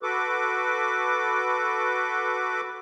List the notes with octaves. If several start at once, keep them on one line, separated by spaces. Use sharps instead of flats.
F#4 A4 B4 D6